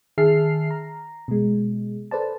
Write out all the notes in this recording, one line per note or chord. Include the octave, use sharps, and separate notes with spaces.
D#3 G#4 E5 A5 F6 C7
A#5
B2 G#3
A4 B4 C5 D5 A5